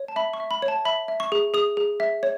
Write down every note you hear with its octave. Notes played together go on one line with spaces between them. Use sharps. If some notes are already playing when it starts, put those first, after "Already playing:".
Already playing: C#5
A5
E5 B5
C#6
E5
B5
C#5
A5
E5 B5
E5
C#6
G#4
G#4 D#6
G#4
E5
C#5